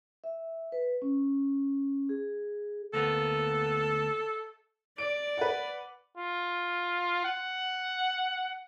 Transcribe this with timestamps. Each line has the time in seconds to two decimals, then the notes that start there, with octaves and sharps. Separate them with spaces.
0.24 E5
0.72 B4
1.02 C#4
2.09 G#4
2.93 D2 A#3 B3 A4
4.98 D5 D7
5.37 B4 F#5
6.17 F4
7.25 F#5